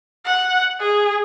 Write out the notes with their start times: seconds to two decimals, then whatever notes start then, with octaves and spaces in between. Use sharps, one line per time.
0.25 F#5
0.80 G#4